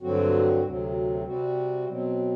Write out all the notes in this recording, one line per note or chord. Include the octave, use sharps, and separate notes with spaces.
G2 D3 F#3 C4 F#4
D2 C3 F#3 C4
C3 G3 C4 F#4
B2 F#3 C4